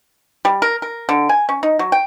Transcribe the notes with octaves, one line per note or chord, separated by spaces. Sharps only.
G3
A#4
A#4
D3
G#5
C#4
D#4
F#3
G5